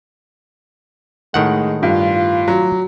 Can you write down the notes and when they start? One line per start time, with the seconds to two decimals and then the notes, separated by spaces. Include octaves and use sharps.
1.34 A2 D#3 G#3 F#5
1.83 G2 F4
2.48 F#3